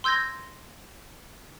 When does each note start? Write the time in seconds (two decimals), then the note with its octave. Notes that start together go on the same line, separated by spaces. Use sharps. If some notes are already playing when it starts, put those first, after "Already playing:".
0.04 C6 E6 G6 G#6 A#6